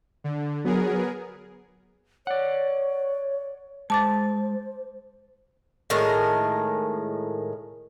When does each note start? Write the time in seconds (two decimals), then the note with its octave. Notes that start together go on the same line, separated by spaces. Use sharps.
0.24 D3
0.65 F#3 B3 G#4 A#4
2.27 C#5 D5 F#5
3.90 G#3 C5 A5 D6 A6
5.90 A2 D#3 G#3 A#4